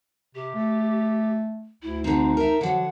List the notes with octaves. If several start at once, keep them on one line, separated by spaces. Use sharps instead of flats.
C3 G4
A3
D2 E4
D3 C4 D#4
A#4 E5
D3 F3 F#3 F#5